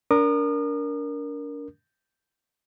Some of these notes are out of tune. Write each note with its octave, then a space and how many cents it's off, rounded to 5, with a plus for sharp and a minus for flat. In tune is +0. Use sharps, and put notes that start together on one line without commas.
D4 -30 A#4 +0 D#6 -40